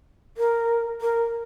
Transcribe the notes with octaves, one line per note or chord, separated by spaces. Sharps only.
A#4
A#4